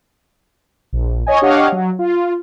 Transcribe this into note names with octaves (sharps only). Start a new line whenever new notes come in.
A#1
C#5 D#5 G#5
D4 G4 C#5 D#5 F5 F#5
F#3
F4